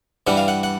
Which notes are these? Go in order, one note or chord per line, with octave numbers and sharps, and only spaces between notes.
G2 E3 G3 F#5
F5
F#5
F#5